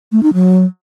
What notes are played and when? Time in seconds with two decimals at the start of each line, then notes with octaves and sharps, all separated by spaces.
0.12 A3
0.23 D#4
0.34 F#3